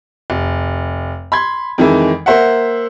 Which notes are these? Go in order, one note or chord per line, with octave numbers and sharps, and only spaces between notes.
F1
B5 C6 G#6
F2 D#3 E3 G#3
A#3 C5 E5 F#5